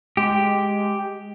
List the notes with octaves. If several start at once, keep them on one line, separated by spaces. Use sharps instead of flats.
G#3 G4